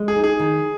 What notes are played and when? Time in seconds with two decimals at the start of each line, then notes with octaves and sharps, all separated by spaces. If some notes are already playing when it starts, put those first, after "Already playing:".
Already playing: G#3
0.08 G#4
0.16 D#4
0.24 G#4
0.39 D#3